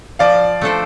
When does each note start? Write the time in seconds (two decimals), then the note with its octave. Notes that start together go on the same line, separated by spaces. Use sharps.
0.19 F3 D5 F5
0.62 A3 D4 A4 C5